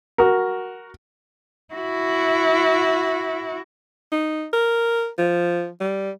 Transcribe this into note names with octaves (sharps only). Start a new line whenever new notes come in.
F#4 A#4
E4 F#4
D#4
A#4
F3
G3